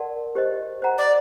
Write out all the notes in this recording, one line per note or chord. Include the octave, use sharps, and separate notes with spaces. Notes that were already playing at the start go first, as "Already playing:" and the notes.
Already playing: A#4 D5 F#5 A5 C6
G4 C5 D#5
C5 F#5 A#5
D5